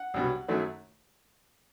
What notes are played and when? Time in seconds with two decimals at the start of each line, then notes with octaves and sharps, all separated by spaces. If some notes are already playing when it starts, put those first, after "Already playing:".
Already playing: F#5
0.14 C2 B2 F#3
0.48 F#2 D#3 F#3 A3